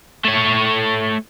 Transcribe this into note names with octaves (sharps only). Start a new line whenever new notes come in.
A3 C#5